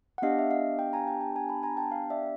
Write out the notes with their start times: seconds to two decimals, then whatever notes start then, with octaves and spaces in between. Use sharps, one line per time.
0.18 F#5
0.22 B3 D4 G4 D#5 F5
0.39 E5
0.51 D#5 F5
0.79 F5 G5
0.93 G#5 A#5
1.07 G5 A5
1.21 G5 A5
1.35 G#5 A#5
1.49 A5 B5
1.63 G#5 A#5
1.77 G5 A5
1.91 F5 G5
2.10 D5 E5